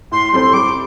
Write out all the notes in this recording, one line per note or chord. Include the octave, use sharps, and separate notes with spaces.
A2 C6
G3 C4 A4 C5 C6
G3 D6